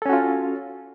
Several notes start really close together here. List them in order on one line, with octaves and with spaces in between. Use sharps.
A4 C#4 F#4 F4